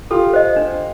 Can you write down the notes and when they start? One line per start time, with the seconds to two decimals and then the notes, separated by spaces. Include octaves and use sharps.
0.11 F4 G4 A4
0.34 C5 D#5
0.56 D4